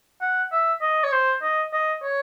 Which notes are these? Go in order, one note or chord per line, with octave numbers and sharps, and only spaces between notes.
F#5
E5
D#5
C#5
C5
D#5
D#5
C#5